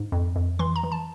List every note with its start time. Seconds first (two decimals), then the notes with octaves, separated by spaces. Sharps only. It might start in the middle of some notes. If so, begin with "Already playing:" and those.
Already playing: G#2
0.12 F2
0.36 F2
0.59 E3 C6
0.76 A#5
0.83 E3
0.92 A5